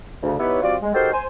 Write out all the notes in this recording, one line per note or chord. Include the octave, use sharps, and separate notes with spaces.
D2 C#3
B3 D#4 E4 G4 B4 C#5
G3 C4 F4 F#4 D5
G#3
D#4 F#4 G4 A4 A#4 C5
C5 G#5